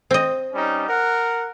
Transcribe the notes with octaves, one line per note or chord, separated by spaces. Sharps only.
C4 D#5
G3 C#4 D#4
A#4 F#5